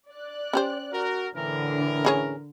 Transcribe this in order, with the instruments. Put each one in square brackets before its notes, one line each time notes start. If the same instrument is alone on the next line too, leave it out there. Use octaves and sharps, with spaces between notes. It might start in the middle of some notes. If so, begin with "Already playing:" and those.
[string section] D5 F#6
[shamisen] C#4 G4 C5
[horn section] F#4 A#4
[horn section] A2 E3 A#4 [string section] D3
[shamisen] C#4 G#4 C#5